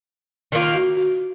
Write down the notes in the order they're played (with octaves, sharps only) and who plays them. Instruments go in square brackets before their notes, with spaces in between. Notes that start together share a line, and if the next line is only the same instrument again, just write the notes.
[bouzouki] D#3 A#3 F4 [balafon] A#4
[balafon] F#4
F#4